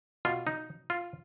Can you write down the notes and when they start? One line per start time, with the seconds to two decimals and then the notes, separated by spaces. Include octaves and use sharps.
0.25 B2 F4
0.47 D#4
0.90 F4